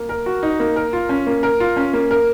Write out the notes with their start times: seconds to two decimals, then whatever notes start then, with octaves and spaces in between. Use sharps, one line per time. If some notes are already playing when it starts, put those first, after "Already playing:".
Already playing: A#3
0.09 A#4
0.26 F#4
0.43 D#4
0.60 A#3
0.76 A#4
0.93 F4
1.09 C#4
1.27 A#3
1.43 A#4
1.60 F4
1.77 C#4
1.93 A#3
2.11 A#4